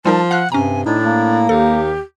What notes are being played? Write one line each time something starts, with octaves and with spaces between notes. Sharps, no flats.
F3 G3 D#4 A#4 A5
F5 F#5 F6 F#6
G2 C3 C#4 G#5 A#5
A2 D4 D#4
A#3
D#2 G4 A4